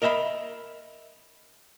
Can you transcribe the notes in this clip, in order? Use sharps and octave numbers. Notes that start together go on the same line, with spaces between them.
A#4 D#5 E5 F#5 B5